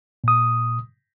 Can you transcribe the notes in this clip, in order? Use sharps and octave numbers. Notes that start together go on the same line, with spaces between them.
A#2 D#6